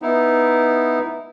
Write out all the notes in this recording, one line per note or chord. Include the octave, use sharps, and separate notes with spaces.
B3 D#4 E4